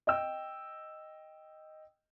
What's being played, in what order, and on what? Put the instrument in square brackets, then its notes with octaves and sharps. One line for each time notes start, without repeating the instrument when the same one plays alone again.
[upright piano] D#5 G5 E6